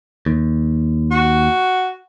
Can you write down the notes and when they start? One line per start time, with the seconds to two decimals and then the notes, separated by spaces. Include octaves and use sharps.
0.26 D#2
1.11 F#4